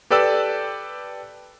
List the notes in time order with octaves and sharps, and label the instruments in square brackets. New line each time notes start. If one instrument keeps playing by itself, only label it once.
[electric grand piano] G4 A4 B4 D5 G5 E6